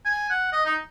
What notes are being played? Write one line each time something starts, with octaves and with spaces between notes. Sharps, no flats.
G#5
F#5
D#5
D#4